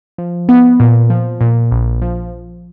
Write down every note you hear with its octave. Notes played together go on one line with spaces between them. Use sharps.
F3
B3
A#2
F3
A#2
A#1
F3